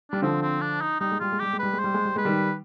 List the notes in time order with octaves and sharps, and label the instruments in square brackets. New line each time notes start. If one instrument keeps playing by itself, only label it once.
[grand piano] G3 [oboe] D4
[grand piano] D3 F3 [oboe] C4
[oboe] C4
D4
D#4
[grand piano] G3 [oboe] D#4
[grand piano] G#3
[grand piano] G3 [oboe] F4
[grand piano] G#3
[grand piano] G3 [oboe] G4
[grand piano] G#3
[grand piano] G3 [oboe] B4
[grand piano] G#3
[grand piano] G3 [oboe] C5
[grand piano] G#3
G3
[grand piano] G#3 [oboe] B4
[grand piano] D#3 G3